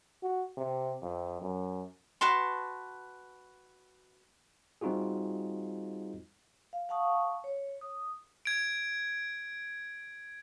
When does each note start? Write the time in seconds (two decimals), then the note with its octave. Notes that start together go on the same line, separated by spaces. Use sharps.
0.23 F#4
0.57 C3
1.02 F2
1.41 F#2
2.21 F#4 B4 A5 C6
4.81 G3 C4 D#4 F4 F#4 G#4
6.73 F5
6.89 F5 F#5 A5 C#6 D#6
7.44 C#5
7.81 D#6
8.45 G#6 D7